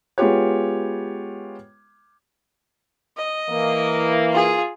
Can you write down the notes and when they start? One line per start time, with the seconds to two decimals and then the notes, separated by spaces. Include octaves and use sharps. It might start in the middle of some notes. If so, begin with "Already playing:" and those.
0.18 G#3 B3 F4 G4 C#5
3.18 D#5
3.49 E3 A#3
4.32 F4 G#4